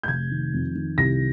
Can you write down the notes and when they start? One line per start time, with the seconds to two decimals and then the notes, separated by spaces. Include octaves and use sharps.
0.03 G6
0.08 F1 G#6
0.31 D#3
0.53 F2
0.75 D#3
0.98 C2 A#6